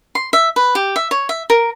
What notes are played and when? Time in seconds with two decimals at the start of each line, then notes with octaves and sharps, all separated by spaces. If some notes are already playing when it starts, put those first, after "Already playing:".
0.15 C6
0.33 E5
0.56 B4
0.75 G4
0.96 E5
1.11 C#5
1.29 E5
1.50 A#4